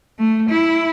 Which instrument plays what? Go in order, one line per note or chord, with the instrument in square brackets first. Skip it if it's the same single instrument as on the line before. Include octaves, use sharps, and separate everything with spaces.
[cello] A3
E4